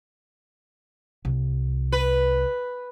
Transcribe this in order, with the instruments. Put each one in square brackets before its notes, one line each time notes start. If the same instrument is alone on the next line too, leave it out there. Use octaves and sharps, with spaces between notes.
[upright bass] C2
[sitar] B4